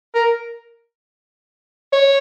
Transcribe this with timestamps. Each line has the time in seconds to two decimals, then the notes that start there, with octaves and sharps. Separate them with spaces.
0.15 A#4
1.93 C#5